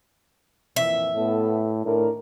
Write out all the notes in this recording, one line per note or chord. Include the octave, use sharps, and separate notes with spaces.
F2 A#2 E3 E5
A2 B3 A4
A2 D#3 D4 A#4